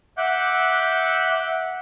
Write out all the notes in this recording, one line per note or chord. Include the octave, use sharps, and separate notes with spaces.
E5 F#5 D6 F#6 G6